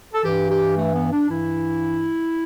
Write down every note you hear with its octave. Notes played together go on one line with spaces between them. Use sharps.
A4
G2 E3 G4
G4
A3
B3
D4
G2 E3 E4